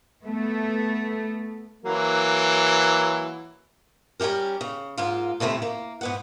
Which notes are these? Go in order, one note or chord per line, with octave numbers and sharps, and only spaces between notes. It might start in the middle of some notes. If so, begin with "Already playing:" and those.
A3 B3
E3 F#3 A#3
G3 C#4 D4 G4 A#4
C#3
G#2 A#3 F4
A2 C3 D#3 A3 C4
A#3
G#2 B3 F#5